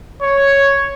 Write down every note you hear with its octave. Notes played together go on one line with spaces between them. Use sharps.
C#5